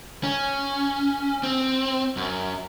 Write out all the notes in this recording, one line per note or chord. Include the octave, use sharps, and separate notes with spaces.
C#4
C4
F#2